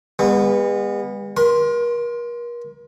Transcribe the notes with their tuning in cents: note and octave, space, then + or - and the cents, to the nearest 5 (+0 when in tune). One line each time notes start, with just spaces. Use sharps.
G#3 -45 B3 -10
A#4 +40 C6 +0